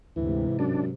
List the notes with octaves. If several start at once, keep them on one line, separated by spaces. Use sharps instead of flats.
D2 G#2 C3 E3
F#2 D4